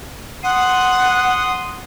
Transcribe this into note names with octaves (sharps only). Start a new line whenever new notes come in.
F#5 C6 D#6